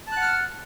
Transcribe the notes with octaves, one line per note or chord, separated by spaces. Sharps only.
F#5 A5 F6 F#6